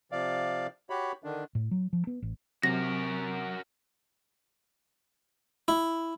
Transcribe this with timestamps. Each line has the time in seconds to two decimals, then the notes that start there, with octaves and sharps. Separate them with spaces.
0.12 C3 F3 D5 F5
0.90 F#4 G4 C#5 B5
1.24 D3 D#3 D4
1.55 A2
1.71 F#3
1.93 F3
2.07 B3
2.22 A1
2.63 C3 F#3 F#4 A#4 A#6
5.68 E4